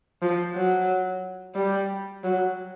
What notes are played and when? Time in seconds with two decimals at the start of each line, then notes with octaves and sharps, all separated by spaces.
0.22 F3
0.55 F#3
1.56 G3
2.24 F#3